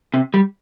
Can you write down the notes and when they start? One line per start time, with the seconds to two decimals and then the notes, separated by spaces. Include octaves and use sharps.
0.14 C3
0.34 G3